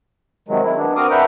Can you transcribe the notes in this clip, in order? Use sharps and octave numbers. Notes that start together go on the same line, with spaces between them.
C3 D#3 F#3 G#3
E4
B3 D4
C4 F#4 A#4 F5 D6 D#6
D4 B4 E5 F#5 G5 A#5